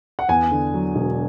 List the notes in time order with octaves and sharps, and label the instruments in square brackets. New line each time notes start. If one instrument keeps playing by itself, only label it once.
[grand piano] F#5
E2 G#5
D3
F#3
E1